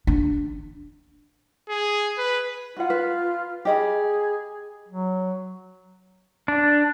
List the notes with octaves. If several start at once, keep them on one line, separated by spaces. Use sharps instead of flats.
D4
G#4
B4
F4 F#4 F#5
B4
G4 G#4 D#5 B5
F#3
D4